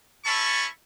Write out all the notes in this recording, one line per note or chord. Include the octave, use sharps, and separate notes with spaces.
C#4 E4 A4 A5 B5 C#6